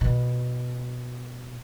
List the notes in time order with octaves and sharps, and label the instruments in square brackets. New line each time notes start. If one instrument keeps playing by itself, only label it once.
[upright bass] B2